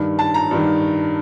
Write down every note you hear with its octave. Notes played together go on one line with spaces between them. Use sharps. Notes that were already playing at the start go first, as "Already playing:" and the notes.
Already playing: G2 D#3
A5
A#5
G2 D#3